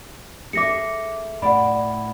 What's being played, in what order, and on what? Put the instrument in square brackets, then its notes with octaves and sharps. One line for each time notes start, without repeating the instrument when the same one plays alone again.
[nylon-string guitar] G#4 A4 E5 [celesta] D6 A#6 C#7
[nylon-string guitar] A2 D5 [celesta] F#5 B5